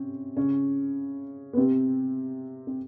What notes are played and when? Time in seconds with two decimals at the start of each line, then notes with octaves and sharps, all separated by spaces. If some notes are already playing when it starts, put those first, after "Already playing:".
Already playing: C3 C4 C#4
0.37 C#3 C#4
1.53 B3
1.57 C3 C4
2.67 C4